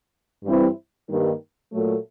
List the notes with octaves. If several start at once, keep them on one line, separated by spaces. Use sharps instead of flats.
G2 E3 G3 C4 E4
G2 D#3 G3 A#3 D#4
A#2 F#3 A3